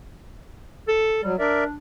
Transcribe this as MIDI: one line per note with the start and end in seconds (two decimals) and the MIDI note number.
0.88 1.20 69
1.23 1.36 54
1.23 1.33 55
1.39 1.78 62
1.39 1.64 70
1.39 1.64 74
1.39 1.64 76